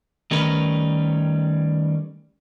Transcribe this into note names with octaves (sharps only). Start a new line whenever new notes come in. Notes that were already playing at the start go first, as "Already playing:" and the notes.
D#3 G3 A3 C#4 A#4 B4